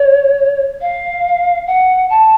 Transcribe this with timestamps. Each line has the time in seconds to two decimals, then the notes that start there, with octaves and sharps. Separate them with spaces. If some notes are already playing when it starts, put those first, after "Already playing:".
Already playing: C#5
0.81 F5
1.67 F#5
2.10 A5